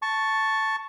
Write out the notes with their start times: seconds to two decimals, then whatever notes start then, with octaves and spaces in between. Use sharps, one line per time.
0.02 A5 C#6